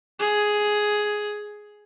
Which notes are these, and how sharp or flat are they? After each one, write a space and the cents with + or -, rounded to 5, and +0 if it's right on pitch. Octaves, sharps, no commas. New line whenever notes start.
G#4 +5